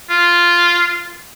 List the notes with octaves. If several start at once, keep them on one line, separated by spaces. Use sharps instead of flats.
F4